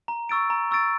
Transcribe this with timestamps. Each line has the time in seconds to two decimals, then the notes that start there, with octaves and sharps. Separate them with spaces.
0.08 A#5
0.29 C#6 E6 A6 D7
0.50 A#5
0.71 C#6 E6 A6 D7